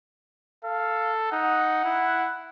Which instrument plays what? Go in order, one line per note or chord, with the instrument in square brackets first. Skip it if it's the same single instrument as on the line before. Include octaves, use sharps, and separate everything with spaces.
[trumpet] A4 [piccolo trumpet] F5
[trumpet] D#4 [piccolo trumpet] F#5
[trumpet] E4